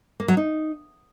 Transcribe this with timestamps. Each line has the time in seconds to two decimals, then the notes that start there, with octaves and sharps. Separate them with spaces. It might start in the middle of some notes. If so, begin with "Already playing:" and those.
0.20 A#3
0.28 F#3
0.37 D#4